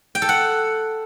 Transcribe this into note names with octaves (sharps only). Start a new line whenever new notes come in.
G5
A4
F#5